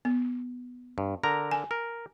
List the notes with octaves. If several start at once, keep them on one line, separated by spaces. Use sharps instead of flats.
B3
G2
D3 A#4 A#5
G#5
A#4